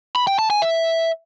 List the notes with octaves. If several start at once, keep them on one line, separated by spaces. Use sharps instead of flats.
B5
G5
A5
G#5
E5